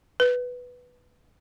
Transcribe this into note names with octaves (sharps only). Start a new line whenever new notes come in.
B4